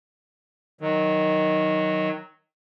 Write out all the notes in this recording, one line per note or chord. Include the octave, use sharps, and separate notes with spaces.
D#3 F#3